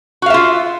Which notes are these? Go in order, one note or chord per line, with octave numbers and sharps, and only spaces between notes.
F4 F#4 E5 F5